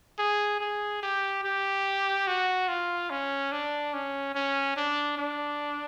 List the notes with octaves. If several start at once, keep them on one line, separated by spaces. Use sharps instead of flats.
G#4
G#4
G4
G4
F#4
F4
C#4
D4
C#4
C#4
D4
D4